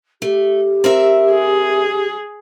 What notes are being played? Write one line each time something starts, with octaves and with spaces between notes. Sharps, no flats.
A3 G4
C4 A#4 E5
G#4